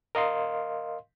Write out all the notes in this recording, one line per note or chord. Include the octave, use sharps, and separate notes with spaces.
A#4 D#5 F5 C6